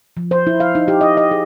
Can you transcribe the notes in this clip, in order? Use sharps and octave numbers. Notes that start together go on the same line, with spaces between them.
F3
C5
E4
F5
D#4
G4
D#5
D#5
G#4